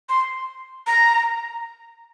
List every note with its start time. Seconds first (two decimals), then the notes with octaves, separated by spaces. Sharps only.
0.09 C6
0.87 A#5